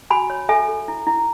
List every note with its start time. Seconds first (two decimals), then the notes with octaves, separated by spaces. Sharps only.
0.10 F#4 G#5 B5
0.30 C#5
0.49 A4 E5 G#5
0.68 A4
0.88 E4
1.07 E4